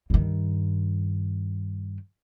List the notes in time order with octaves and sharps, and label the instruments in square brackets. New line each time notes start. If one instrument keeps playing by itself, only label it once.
[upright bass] G2 D#3